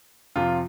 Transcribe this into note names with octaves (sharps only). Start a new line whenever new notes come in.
F2 C3 F3 F4